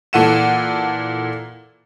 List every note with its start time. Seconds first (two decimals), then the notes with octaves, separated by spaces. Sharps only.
0.13 A#2 E3 A4 F#5 D#7 E7